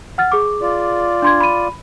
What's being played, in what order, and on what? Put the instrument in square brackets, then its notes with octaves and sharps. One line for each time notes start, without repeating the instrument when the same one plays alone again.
[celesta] F#5 F6 A6
G#4 D6
[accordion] F4 D5
[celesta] D4 C6 G#6
B5 D#7